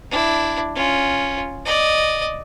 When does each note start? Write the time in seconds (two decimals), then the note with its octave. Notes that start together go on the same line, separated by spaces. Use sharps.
0.10 D4 E4
0.75 C#4 F4
1.65 D5 D#5